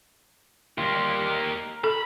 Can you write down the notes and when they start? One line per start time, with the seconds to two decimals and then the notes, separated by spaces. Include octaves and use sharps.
0.78 G3 A#3 F4 G4
1.30 A#4
1.84 A4 B5